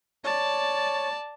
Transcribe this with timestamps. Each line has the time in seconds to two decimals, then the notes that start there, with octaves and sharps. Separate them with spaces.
0.24 C#5 D5 A5